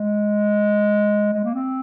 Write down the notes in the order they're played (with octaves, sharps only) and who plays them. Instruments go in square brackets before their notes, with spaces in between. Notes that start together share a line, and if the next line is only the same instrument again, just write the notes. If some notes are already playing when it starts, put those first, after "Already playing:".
Already playing: [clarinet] G#3
G#3
A#3
C4